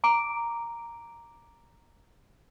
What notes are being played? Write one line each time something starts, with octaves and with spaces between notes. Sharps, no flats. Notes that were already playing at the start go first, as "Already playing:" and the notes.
A#5 D6 D7